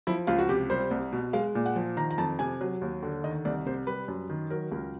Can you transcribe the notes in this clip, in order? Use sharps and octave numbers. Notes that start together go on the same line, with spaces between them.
F3 E4
C#2 F4
F#4
C3 G4
G3 C5
C2
B2
G#3 F5
A#2
F#5
F3
D#3 A#5
A#5
F2 A5
C3 G#5
F#3
D#2
D3
D#3 D#5
C2 D5
C3 C5
G3 B4
F#2
D#3
F#3 A#4
C#2